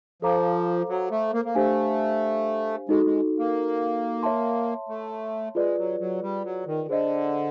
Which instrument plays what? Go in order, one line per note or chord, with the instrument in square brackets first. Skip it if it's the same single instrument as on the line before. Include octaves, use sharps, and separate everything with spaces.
[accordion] F3 [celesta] A4 C5 F5 A#5 D6
[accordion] F#3
A3
A#3
A#3
[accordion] A3 [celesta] D4 G4 C5 F5 G#5
[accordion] G#3 [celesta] D#4 F#4 A4
[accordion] G#3
A#3
[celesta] C#5 E5 A5 C6
[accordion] A3
[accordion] G#3 [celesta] F4 G#4 B4 D5
[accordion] F#3
F#3
G3
F#3
D#3
[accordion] D3 [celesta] G#4 C5 D#5